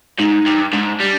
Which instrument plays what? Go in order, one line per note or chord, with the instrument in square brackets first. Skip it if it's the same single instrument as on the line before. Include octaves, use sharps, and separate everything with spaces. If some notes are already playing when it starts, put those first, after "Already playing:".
[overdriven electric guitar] G#2 [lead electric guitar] D#4
[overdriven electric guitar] G2
[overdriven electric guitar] G#2 [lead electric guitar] D4
[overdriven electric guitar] G3